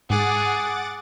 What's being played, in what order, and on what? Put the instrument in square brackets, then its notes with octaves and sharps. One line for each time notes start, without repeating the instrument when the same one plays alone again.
[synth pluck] G#2 [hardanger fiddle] G#4 [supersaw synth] F#5 D6 A6